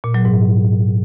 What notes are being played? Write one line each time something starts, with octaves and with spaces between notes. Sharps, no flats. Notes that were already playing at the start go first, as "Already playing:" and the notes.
A#2
F#3
G#2